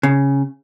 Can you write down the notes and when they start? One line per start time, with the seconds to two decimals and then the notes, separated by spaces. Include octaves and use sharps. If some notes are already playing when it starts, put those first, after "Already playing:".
0.03 C#3